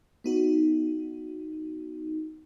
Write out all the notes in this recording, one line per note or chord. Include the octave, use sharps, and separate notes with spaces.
B3 D#4 F#4